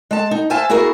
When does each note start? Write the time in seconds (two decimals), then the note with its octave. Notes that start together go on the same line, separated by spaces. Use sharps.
0.11 G#3 A5
0.31 D#4
0.50 C5 E5 F5 G#5 A5
0.69 B3 E4 F#4 G#4 A#4